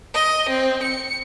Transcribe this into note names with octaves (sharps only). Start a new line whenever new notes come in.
D#5
C4
C#7